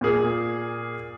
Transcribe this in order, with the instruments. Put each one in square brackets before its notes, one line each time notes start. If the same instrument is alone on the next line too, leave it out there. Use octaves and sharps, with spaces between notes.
[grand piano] A#2 A#3 G#4